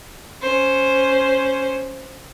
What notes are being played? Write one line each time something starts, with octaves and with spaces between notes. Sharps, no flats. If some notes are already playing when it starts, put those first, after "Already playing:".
C#4 C5